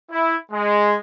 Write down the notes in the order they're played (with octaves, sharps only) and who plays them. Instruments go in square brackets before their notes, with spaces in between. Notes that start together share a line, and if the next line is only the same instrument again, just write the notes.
[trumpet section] E4
G#3